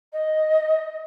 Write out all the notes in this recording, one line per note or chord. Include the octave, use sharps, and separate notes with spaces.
D#5